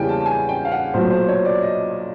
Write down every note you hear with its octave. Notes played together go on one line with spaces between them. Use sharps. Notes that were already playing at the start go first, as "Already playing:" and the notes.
Already playing: E2 C#3 E3 G3 A#3 G5 G#5
A5
A5
G#5
G5
F5
F#5
B1 A#2 F#3 A3 C5
C5
C#5
D5
D#5